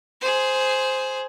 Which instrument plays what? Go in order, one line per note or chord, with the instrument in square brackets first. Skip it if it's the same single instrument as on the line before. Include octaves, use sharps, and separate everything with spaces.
[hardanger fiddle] G#4 C5